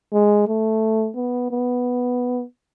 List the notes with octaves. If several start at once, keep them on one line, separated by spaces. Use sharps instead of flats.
G#3
A3
B3
B3